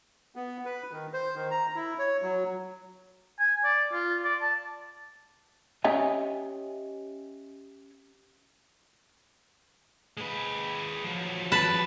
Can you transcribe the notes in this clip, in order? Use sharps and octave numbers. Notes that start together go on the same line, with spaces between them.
B3
B4
D#3
C5
D#3
A#5
E4
C#5
F#3
G#5
D5
F4
D5
A5
C#4 G4 C#5 D#5 E5 G#5
G#3 B4
F3 F#3
B4 A5